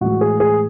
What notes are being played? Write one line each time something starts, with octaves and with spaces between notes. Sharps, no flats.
A2 E3 G#3 F#4
G#4
G#4